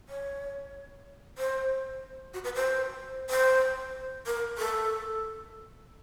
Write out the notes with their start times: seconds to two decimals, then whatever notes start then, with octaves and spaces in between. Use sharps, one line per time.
0.09 C#5
1.38 C5
2.34 F#4
2.44 B4
2.56 C5
3.30 C5
4.26 A#4
4.58 A4